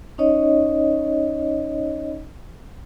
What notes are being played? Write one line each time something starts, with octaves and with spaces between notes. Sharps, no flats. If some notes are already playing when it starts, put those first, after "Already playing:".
C#4 D#4 C#5 D#5